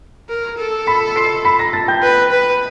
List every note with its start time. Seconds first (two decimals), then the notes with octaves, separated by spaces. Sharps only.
0.29 A#4
0.58 A4
0.87 B5 B6
1.16 C6 C7
1.45 B5 B6
1.59 A#5 A#6
1.73 A5 A6
1.88 G5 G6
2.02 B4
2.31 B4